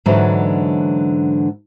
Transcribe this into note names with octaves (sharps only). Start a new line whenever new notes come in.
G#2 D3 E3 F#3 C#4 D4